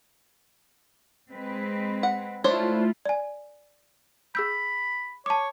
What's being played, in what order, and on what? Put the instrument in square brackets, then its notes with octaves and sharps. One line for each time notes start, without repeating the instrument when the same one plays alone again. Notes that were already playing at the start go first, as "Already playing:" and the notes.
[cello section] G#3 C4 B4
[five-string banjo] F#5
[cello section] A3 E4 F4 [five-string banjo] D4 C5 C#5
[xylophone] D5 G#5
[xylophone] G#4 E6 G6 [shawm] B5
[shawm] C#5 [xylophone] A5 D6